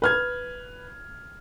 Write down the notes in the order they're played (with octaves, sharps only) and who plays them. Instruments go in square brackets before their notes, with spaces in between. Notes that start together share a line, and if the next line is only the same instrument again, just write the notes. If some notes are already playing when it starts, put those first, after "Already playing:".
[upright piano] B4 F6 G#6